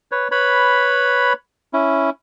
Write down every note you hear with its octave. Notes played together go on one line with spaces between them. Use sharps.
B4 C#5
B4 C#5 B5
C#4 E4